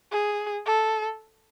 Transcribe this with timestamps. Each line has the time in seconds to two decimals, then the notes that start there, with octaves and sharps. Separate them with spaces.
0.12 G#4
0.66 A4